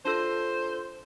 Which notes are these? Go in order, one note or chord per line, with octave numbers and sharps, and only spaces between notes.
D4 F4 A4 C5